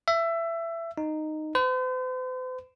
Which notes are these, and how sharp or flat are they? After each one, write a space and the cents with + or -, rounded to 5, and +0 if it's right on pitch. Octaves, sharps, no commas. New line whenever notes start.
E5 +20
D#4 -10
C5 -45